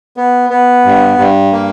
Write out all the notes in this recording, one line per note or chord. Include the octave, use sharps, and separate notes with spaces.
B3
B3
G2
G2
A#3